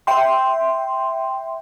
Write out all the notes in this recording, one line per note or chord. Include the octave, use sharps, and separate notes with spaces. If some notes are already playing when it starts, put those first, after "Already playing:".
E5 G5 C6